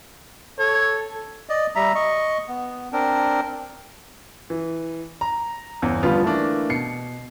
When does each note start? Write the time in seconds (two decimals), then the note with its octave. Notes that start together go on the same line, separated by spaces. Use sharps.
0.59 A4 C#5
1.49 D5 D#5
1.76 G3 E5 A#5
1.95 D#5 C#6
2.48 B3
2.93 C4 D4 A#4
4.50 E3
5.21 A#5
5.82 G1 E2
6.03 D3 F3 G3 B3 F4
6.23 E3 A3 A#3 D4
6.70 B2 C7 C#7